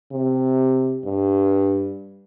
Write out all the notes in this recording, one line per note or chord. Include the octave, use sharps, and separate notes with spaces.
C3
G2